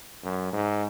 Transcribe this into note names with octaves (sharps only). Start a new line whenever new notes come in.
F#2
G#2